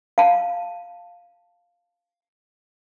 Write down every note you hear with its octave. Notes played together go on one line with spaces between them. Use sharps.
F5 A5